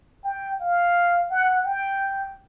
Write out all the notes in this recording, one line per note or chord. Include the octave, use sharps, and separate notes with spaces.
G5
F5
F#5
G5